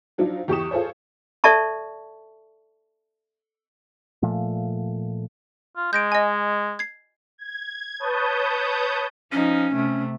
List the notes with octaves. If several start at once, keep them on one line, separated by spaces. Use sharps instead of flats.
F3 F#3 D4 D#4 F4
E2 G4 C#6 D#6 E7
F4 G#4 A4 C5 C#5
A4 D5 E5 A5 C#6
A#2 F3 A3
F4
G#3 G6 A#6 D7
D#5 G#5
G#6 C7
G#6
B4 C#5 A5 D#6 G6
F3 C#4 D#4
C3 A3